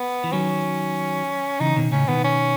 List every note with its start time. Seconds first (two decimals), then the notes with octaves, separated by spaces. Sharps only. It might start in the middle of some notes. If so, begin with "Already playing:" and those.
Already playing: B3
0.24 E3
0.32 D#3 F#3 C#4
1.60 C#3 E3 D#4
1.76 B2 D#3
1.92 A2 C#3 C#4
2.08 B2 D#3 B3
2.24 C#4